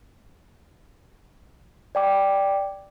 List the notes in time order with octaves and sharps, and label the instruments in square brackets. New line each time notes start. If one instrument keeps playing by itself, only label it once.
[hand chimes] D5 G5 D6